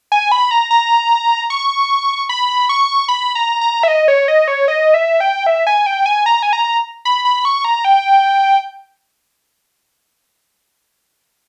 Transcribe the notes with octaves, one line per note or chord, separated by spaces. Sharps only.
G#5
B5
A#5
A#5
C#6
B5
C#6
B5
A#5
A#5
E5
D#5
C#5
D#5
C#5
D#5
E5
G5
E5
G#5
G5
G#5
A#5
G#5
A#5
B5
B5
C#6
A#5
G5